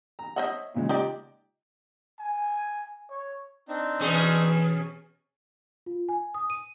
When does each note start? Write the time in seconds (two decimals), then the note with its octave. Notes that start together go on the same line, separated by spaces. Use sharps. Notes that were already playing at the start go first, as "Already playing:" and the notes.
0.19 A#5
0.36 C5 C#5 D#5 E5 F#5 D#6
0.74 A#2 C#3 G#3
0.89 D#4 G4 D5
2.19 G#5
3.11 C#5
3.68 C4 D4 D#4
4.00 B2 E3 C#4 G#4
5.86 F4
6.09 G#5
6.34 D#6
6.50 D#7